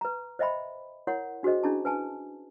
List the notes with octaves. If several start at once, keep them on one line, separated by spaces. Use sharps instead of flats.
B4 A#5
C5 D#5 E5 G5 B5 C6
E4 A#4 C#5 F#5 C6
D4 F#4 G#4 C5 D#5
C#4 D4 E4 G#4 A5 C#6
B4 G#5 A5